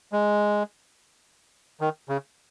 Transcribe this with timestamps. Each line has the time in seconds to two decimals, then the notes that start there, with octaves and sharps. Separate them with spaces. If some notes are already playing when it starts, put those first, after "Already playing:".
0.12 G#3
1.81 D#3
2.09 C#3